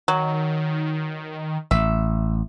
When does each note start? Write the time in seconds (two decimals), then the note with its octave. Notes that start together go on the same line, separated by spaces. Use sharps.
0.08 D#3 F#3
1.71 A1 E5